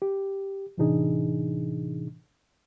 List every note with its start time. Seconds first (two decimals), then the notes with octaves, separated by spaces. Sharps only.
0.02 G4
0.78 A2 C3 E3 D4 D#4 G#4